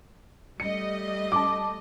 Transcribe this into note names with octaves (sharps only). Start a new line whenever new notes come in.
G3 A3 D#5 C#7
A5 D6